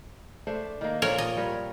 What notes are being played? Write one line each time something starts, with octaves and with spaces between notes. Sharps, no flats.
A3 D4 C5
D#3 A#3
A#2 F3 F4 A#4 C#5
D#5
G3 A#4 C#5